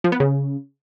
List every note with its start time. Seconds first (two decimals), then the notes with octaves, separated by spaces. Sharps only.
0.04 F3
0.12 B3
0.20 C#3